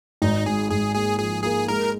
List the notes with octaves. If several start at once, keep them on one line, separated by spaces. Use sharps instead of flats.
G#1 D#4
G#2 G#4
G#1 G#4
A#3 G#4
F3 G#4
A#3 G#4
G#3 A#4